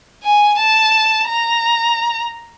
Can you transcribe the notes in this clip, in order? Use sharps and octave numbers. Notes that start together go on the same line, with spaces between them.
G#5
A5
A#5